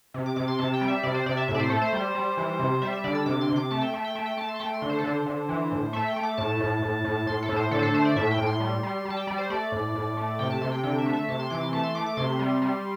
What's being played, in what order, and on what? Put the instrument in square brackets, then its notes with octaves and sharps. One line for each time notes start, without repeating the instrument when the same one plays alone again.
[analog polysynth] C3
D6
C3 D6
C6
C3 A5
G5
G3
E5
C3 D5
C5
C3 D5
E5
A2 E5
D5
C5
A3 A4
C5
G3
G3
E3
C3
G3 E5
E5
D3 D5
E6
C3 D6
C6
C3
D6
A3 A5
G5
A3 E5
G5
A3 E5
G5
A3 A5
C6
A5
A3 G5
C6
D3
C5
A4
D3 C5
D3
E3
A2
A3 E5
G5
A3
D6
A2 A5
A2
A2
A2
A2 C6
A4
A2
C5
D3 A4
C5
A4
A3 C5
D5
A2 E5
G5
A2
C6
G3
G3
G3
A5
G5
G3 D5
C5
A3 D5
A2
A2
A3
C3 G5
A5
C3 C6
G5
D3 G5
E5
A3
E5
C3 A5
C6
E3 D6
C6
A3 A5
C6
A3 D6
D6
C3 C6
G3
G3